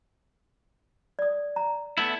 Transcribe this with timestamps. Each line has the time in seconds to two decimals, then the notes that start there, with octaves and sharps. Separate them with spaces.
1.19 D5 D#6
1.56 A#5
1.98 A3 B3 E4